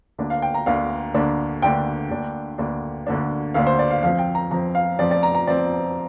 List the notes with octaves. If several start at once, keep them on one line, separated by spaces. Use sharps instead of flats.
D2 D3 A#3 D4
F5
G5
A#5
D2 D3 A#3 D4 F5
D2 D3 A#3 D4
D2 D3 A#3 D4 G5
D2 D3 A#3 D4
D2 D3 A#3 D4
D2 D3 A#3 D4
D2 D3 A#3 D4 F5
C5
D5
F5
F2 F3 C4 F5
G5
A#5
F2 F3 C4 A#5
F5
F2 F3 C4 D5
D5
A#5
A#5
F3 C4 D5